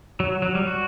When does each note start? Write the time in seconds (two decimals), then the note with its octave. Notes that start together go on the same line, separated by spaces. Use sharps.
0.20 F#3
0.42 F#3
0.55 G3
0.67 F#4